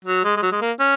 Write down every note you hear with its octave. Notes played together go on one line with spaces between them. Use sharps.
F#3
G#3
G#3
F#3
G#3
A#3
C#4